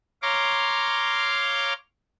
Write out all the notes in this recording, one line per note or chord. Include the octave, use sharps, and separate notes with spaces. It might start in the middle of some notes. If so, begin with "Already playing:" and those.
C#5 F5 A#5 C6 D6